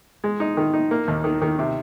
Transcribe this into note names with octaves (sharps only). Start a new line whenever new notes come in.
G#3
D#4
D#3
D#4
A#3
D#2
D#3
D#3
C3